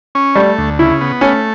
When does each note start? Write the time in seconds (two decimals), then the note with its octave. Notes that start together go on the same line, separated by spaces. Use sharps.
0.15 C#4
0.35 G3 A3
0.58 D2
0.79 C#3 E4
1.01 B3
1.21 A3 C#4